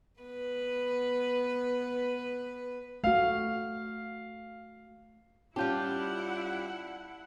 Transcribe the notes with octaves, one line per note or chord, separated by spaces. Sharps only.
B3 B4
A3 F#4 F5
G3 C#4 E4 F4 G4 F#5 A5 G6